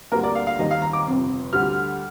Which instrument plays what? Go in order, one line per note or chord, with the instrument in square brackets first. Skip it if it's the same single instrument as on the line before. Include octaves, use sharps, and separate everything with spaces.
[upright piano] D2 D3 G3 A#3 A#4
D5
F5
F5
D#2 D#3 G3 D#5
F5
A#5
D6
G1 F2 C3
D2 D3 G3 F6